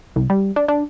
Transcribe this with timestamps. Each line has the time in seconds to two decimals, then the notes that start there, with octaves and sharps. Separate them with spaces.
0.16 C2
0.30 G3
0.56 D4
0.68 D4